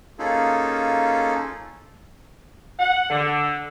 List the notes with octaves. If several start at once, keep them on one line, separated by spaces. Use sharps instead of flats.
A#3 C#4 D#4 F4 G#4 A4
F#5
D3